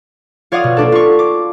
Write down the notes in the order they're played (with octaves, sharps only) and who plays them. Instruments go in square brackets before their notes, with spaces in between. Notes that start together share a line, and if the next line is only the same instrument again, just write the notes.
[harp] F4 C#5 D5 F5 F#5 D#6
B2
A#3 D4 A4
F4 C#6
D6